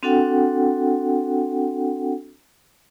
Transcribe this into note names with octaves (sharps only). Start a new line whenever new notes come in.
C4 D4 F#4 A4 F#5 G5